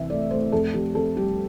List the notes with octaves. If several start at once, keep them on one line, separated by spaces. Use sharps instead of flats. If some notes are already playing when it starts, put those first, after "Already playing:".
Already playing: C2 E3 C4 E5
A3 D5
A3 C5
F2 A4
F2 G4
F2 A4
G3 G4